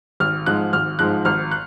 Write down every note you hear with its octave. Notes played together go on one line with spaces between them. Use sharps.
G#1 F6
G#2 F3 G#3 F#6
G#1 F6
G#2 F3 G#3 F#6
G#1 F6
F#6